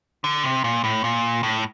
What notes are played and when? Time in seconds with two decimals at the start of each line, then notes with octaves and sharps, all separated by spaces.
0.24 D3
0.43 C3
0.64 A#2
0.84 A2
1.04 A#2
1.43 A2